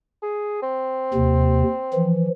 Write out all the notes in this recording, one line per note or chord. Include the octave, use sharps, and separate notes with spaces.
G#4
C4
D#2 C3
E3 F3